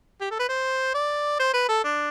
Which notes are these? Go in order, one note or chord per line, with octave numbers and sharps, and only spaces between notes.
G4
A4
B4
C5
D5
C5
B4
A4
D4